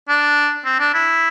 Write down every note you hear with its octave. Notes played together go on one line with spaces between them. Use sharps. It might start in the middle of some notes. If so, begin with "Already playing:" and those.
D4
C4
D4
E4